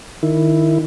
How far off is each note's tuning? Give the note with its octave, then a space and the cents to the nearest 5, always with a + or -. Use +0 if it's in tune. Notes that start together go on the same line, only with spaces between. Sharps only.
D#3 -10 E4 +0